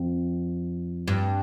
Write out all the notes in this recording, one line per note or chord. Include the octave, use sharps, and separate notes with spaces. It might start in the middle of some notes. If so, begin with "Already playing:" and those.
Already playing: F2
G2